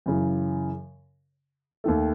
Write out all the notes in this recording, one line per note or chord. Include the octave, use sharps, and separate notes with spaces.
F#2 C#3 E3
D#2 D#3 A3